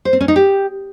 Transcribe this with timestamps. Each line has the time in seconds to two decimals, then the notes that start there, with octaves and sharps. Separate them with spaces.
0.05 C5
0.13 C4
0.21 C#4
0.28 D#4
0.36 G4